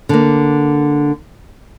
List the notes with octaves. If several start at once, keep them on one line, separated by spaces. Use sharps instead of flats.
D3 A#3